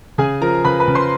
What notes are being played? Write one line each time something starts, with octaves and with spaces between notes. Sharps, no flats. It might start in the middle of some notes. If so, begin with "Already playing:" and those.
C#3 G#4 G#5
F3 A#4 A#5
C#3 B4 B5
B4 B5
C#3
C5 C6